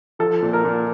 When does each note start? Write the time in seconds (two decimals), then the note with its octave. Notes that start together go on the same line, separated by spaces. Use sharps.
0.19 F3 A4
0.42 A#2
0.53 A#4
0.64 A#2